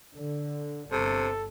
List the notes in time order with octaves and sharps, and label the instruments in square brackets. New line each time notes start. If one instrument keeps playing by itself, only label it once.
[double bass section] D3
[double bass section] G1 [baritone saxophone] C3 [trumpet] A4